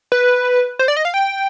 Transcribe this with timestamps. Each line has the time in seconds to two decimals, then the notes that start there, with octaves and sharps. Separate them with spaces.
0.12 B4
0.79 C5
0.88 D5
0.97 D#5
1.05 F5
1.14 G5